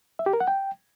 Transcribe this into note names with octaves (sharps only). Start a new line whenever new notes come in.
E5
G4
A#4
F#5
G5